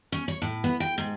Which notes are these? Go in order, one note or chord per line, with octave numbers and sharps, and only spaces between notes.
C#4
C#5
A2
B3
G5
G#2